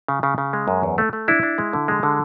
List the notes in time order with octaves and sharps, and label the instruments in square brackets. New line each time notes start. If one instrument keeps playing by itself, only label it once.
[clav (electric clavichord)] C#3
C#3
C#3
G#3
F#2
E2
A3
A3
D4 E4
D4
G#3
D3
G#3
D3